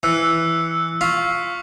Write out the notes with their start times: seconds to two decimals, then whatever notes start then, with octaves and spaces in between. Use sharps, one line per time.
0.03 E3 E6 F#6 C#7
1.01 F4 C#6 E6 B6